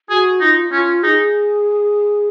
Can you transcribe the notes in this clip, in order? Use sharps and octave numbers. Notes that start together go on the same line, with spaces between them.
F#4 G#4
D#4 F4
C#4 F4
D#4 G#4